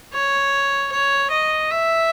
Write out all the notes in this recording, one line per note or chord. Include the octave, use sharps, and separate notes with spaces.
C#5
C#5
D#5
E5